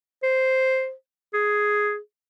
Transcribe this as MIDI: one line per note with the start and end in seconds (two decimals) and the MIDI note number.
0.23 0.93 72
1.34 1.98 68